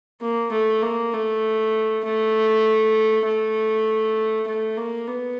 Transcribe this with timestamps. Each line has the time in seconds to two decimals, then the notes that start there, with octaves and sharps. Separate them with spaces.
0.21 A#3
0.52 A3
0.82 A#3
1.13 A3
2.04 A3
3.25 A3
4.47 A3
4.77 A#3
5.07 B3